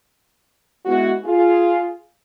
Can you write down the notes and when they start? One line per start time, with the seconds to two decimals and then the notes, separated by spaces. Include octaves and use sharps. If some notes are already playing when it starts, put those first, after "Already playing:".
0.85 G#3 B3 E4 F#4
1.24 F4 G#4